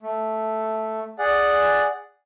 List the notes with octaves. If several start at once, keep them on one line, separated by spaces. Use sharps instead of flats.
A3
G#4 D5 F#5